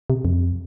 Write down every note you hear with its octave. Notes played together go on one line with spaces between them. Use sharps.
C3
F2